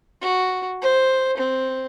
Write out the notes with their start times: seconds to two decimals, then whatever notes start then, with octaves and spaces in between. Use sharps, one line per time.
0.22 F#4
0.81 C5
1.38 C4